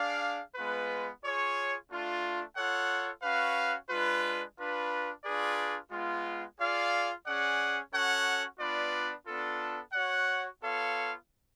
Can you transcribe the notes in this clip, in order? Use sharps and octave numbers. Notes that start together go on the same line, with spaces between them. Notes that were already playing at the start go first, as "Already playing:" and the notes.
Already playing: D4 G#4 D5 F5
G#3 B3 F4 B4
F4 G#4 C#5
A3 D4 F4
F4 A4 C#5 F#5
C#4 F#4 B4 F5
G#3 D4 F4 B4
D4 F4 B4
D4 F4 G#4 B4 D5
G#3 B3 F4
F4 G#4 D5 F5
C#4 G#4 D5 F#5
C#4 F#4 A4 C#5 F#5
B3 D4 F4 B4 D5
B3 D4 F4 A4
F#4 C#5 F#5
B3 F4 A4 C#5 F5